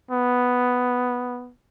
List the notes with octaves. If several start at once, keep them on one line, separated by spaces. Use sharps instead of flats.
B3